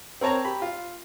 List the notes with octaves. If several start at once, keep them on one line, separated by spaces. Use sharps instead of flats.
C4 A#4 C#5 A5 A#5
G4 B5
F4